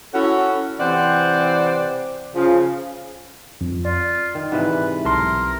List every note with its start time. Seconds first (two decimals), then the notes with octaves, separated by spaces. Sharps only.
0.14 C#4 E4 F#4 A4
0.79 C3 E3 C4 C5 D5 F#5
2.35 C#3 F3 F4
3.61 F2
3.85 F4 D5
4.35 D#3
4.52 G#2 C3 E3 B4
5.05 B1 A4 A#4 C6